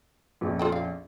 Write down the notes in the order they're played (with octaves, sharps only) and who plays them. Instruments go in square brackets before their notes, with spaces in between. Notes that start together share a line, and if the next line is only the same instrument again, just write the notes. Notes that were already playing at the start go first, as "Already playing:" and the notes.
[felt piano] A#1 F2 C#4
[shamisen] F4 A4 G5
F5